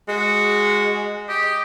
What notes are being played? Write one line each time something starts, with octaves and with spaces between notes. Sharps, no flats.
G#3 F#4
G4 D#5